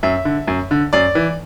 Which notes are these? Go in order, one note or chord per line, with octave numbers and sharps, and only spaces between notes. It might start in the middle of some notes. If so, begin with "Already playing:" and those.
F#2 E5
D3
F#2
D3
F#2 D5
E3